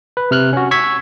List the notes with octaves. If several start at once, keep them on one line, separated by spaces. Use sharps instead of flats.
B4
C3 F6 F#6
C#4 F#4
C#6 E6 G#6 B6